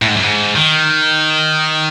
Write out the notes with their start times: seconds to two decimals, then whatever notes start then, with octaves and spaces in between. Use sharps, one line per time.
0.02 A2
0.08 G#2
0.16 F#2
0.23 G#2
0.56 D#3